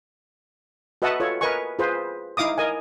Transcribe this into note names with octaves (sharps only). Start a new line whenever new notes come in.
F#4 B4 D#5 E5 F#5 A5
F4 A4 C#5
A#4 B4 D#5 G#5 C#6
F4 G#4 B4 C5
D#4 E4 F5 D6 D#6
A#4 D#5 G#5